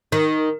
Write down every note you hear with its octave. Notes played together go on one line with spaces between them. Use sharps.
D#3